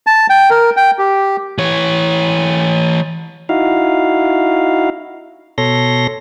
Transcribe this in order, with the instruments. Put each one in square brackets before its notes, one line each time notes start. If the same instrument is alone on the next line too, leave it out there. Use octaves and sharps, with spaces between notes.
[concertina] A5
G5
A#4
G5
G4
[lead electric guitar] E3 C#5
[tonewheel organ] D#4 E4 F#4 F5
B2 A4 C#5 C6 A#6